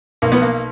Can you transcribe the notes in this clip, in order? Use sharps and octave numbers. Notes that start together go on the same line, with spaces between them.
B1 A#3
B3
A#3